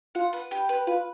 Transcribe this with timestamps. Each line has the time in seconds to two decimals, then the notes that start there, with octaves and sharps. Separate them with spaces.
0.15 F4 F#5
0.33 B4
0.51 G4
0.69 B4
0.87 F4 B4